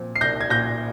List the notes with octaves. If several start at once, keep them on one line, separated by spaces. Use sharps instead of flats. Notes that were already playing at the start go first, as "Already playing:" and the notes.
Already playing: A#2 F3 C4
C7
C2 G6 A#6
G#6
A#2 G6 A#6